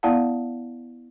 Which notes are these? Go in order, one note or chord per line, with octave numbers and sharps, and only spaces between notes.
B3 E4 D5 F5 F#5 A5